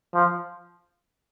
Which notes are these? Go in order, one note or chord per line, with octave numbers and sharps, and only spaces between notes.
F3